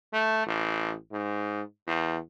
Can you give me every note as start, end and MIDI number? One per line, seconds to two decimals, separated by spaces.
0.13 0.45 57
0.46 0.94 33
1.11 1.62 44
1.87 2.18 40